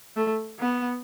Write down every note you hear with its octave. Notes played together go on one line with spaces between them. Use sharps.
A3
B3